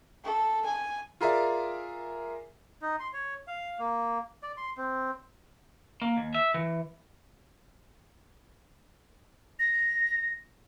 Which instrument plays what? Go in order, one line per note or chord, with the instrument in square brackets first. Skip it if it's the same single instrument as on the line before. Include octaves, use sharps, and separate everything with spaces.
[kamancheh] A4
G#5
[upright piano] F4 G#4 A#4 D5 E5
[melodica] D#4
C6
C#5
F5
A#3
D5
C6
C4
[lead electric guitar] A#3
D#2
E5
E3
[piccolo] A#6